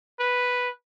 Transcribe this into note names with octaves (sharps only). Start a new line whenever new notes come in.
B4